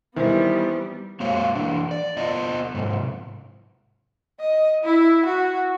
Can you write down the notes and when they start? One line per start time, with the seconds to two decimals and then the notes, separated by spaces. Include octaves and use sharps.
0.16 D#3 E3 G3 B3 C4 E4
1.20 G#3 A#3 F#4 C5 C#5 F5
1.55 E3 D4
1.91 D5
2.17 B3 F4 D#5
2.74 G#2 C3
4.40 D#5
4.84 E4
5.25 F#4